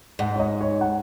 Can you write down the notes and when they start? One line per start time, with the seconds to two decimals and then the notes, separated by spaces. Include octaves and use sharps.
0.19 G#2 F#5
0.36 C#5
0.39 D#5
0.61 C#5
0.81 F#5